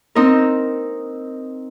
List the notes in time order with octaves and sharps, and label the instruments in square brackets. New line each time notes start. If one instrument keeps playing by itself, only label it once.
[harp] C4 D#4 A#4